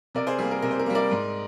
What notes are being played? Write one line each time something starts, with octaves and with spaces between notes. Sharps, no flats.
C3 A#4 D5
G#4 C5
G3 A#3 G#4
A#4
C3 A#4
C5
A#4
G3 A#3
A#4 D5
G#2